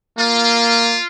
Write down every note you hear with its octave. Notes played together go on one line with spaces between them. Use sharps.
A#3 F4